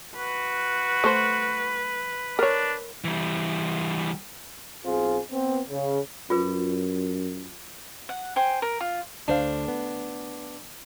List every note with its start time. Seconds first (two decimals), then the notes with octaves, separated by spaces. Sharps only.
0.16 F#4 B4
1.04 A3 C5
2.39 D4 A#4 C#5
3.04 E3 G3
4.85 B1 C4 F4 G#4
5.31 B3 C4
5.70 C#3
6.30 F#2 F4 G#4 B4
8.09 F#5
8.36 C5 G5 G#5
8.62 A#4
8.80 F4
9.28 D2 D4 C5 F5
9.68 B3